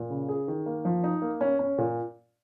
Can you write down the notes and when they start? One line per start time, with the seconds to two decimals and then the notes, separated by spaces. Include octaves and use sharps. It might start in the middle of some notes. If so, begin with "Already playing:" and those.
Already playing: A#2
0.10 C#3
0.29 G#4
0.48 D#3
0.66 A#3
0.85 F3
1.04 D#4
1.22 A#3
1.41 C#4
1.59 C#4
1.78 A#2